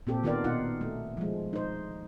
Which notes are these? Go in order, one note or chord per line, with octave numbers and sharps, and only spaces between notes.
A#2 C4 G4 A4
D#3 B3 F4 G4 A#4 D5
B2 D#4 F4 F#5
A3
F3 G#3
D#4 C5